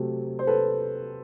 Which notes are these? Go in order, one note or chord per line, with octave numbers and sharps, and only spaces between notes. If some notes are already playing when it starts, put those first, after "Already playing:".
Already playing: C3 F#3 A3
C5
A4 B4